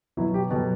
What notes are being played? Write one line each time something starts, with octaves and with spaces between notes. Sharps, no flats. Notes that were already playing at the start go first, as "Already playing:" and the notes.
B2 F#3 E4
G4
B2 F#3 A4